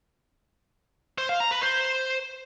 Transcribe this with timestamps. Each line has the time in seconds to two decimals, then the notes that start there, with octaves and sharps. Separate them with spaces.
1.18 C5
1.29 F5
1.41 A#5
1.52 B4
1.63 C5